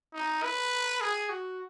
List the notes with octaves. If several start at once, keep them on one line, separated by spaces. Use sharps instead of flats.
D#4
B4
G#4
F#4